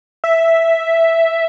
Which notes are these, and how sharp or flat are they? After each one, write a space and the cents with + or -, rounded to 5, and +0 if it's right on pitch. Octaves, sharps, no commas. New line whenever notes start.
E5 +0